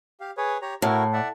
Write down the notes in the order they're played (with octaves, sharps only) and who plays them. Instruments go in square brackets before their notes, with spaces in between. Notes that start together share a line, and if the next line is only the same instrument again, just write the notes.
[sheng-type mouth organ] G4 F5
G#4 B4 C#5
G4 C#5 A#5
[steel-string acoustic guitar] A2 [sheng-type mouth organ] E4 F#4 A#4
[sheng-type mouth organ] D5 E5 F#5